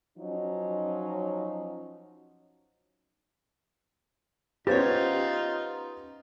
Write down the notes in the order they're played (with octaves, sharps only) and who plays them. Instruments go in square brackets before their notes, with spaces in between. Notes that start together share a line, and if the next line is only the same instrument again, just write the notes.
[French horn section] F3 F#3 C#4 D#4
[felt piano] B3 C#4 A6 [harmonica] D#4 F4 [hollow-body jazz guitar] G4 C5 C#5